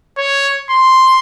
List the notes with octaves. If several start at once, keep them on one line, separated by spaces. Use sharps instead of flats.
C#5
C6